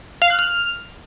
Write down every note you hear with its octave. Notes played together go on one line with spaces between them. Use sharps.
F5
F#6
F6